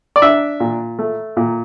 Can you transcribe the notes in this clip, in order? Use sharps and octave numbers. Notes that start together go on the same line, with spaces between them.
D5
D4 E5
A#2
A3
A#2